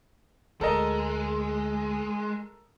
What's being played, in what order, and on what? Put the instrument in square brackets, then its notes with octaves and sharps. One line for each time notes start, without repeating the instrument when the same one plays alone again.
[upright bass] D2 [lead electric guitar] G#3 [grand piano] A4 A#4 D#5